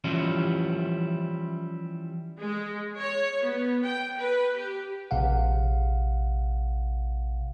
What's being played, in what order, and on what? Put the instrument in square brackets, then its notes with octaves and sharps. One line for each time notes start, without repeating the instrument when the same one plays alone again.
[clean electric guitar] E3 F3 G3 C#4 E4
[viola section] G#3
C#5
B3
G5
B4
G4
[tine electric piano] A#1 C3 F5 F#5